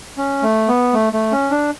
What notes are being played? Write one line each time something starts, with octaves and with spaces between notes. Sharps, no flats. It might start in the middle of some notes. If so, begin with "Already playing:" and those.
C#4
A3
B3
A3
A3
C#4
D4